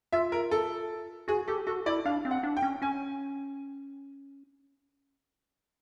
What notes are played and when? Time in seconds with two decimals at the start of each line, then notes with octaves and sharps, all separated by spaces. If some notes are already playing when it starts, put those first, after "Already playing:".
0.13 F4 E5
0.32 A#4
0.51 A4
1.28 F#4 G#4
1.48 G4 A4
1.67 F#4 A4
1.86 E4 D5
2.05 D4 F5
2.25 C4
2.31 F#5
2.43 D4
2.57 G5
2.62 C#4
2.82 C#4 G#5